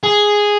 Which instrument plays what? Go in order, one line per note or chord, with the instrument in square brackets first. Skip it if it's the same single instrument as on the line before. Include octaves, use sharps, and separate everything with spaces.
[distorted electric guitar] G#4